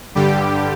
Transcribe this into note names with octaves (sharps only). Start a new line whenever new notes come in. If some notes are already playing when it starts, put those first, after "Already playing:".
G2 D3 G3 G4